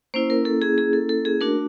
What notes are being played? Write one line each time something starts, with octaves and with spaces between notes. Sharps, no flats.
A#3 C#4 E4 C5
A#4
A4
G#4
G#4
A4
A4
G#4
A3 D4 F#4 A#4